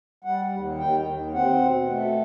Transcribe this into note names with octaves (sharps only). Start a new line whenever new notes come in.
G3 F#5
D#2
D#3 G5
D#2
C4 F#5
B2
A3